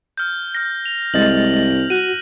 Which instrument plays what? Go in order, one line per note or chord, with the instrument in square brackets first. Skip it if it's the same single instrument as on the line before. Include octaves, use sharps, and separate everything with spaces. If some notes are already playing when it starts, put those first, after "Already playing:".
[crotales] F6 G6
F6 A#6
F7
[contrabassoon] C2 [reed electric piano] G#3 D#5 A6 [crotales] F#7
[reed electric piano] F#4 [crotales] F#6 D#7